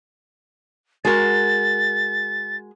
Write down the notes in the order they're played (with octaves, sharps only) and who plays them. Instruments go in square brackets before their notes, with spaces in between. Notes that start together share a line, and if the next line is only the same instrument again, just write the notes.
[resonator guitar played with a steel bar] G#3 F#4 A#4 [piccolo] A6